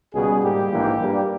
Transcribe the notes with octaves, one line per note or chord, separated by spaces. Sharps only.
C#2 B2 G3 G#4
G#2 G3 A#3 G4
A#1 G#2 E3 A#3
G2 G3 A#3